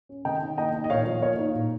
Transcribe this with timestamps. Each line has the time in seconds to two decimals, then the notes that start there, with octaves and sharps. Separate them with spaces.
0.09 C#4
0.25 C3 D#5 G5
0.41 D#3
0.58 A#3 D#5 G5
0.74 D#4
0.84 D#5
0.90 A#2 C#5 F5
1.06 F3
1.22 A#3 C#5 F5
1.38 D#4
1.54 A#2